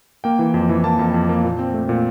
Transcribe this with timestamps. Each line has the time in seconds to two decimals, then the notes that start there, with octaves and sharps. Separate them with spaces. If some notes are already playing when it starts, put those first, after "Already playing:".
0.24 A#3 G5
0.39 E3
0.54 F2
0.69 E3
0.84 A#3 A5
0.99 F2
1.14 F2
1.29 A#3
1.44 A#2
1.59 C4
1.74 A3
1.89 A#2